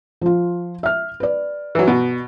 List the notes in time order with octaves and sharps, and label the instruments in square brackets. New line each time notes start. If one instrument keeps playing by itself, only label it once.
[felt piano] F3 F4
E5 F6
B4 D5
[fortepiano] E3 F#3
B2